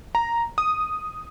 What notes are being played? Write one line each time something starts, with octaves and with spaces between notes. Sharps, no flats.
A#5
D#6